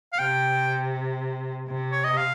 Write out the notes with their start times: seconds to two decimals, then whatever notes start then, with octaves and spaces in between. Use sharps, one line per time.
0.13 F5
0.18 C3 G5
1.68 C3
1.92 C#5
2.04 D#5
2.17 F5